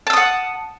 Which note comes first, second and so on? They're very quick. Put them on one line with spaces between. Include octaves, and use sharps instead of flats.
A5 E6 D#6 F#5